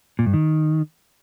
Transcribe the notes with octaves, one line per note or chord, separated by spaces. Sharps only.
A#2
G2
D#3